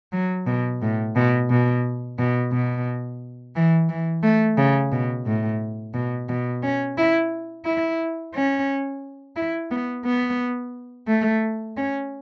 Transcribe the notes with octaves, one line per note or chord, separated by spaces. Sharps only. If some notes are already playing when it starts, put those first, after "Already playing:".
F#3
B2
A2
B2
B2
B2
B2
E3
E3
A3
C#3
B2
A2
B2
B2
C#4
E4
E4
C#4
E4
B3
B3
A3
C#4